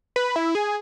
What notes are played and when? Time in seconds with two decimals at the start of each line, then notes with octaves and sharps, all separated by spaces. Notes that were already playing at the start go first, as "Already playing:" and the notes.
0.16 B4
0.36 E4
0.55 G#4